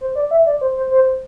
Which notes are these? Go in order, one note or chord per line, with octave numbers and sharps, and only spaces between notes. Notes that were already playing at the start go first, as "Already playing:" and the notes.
C5
D5
E5
D5
C5
C5
C5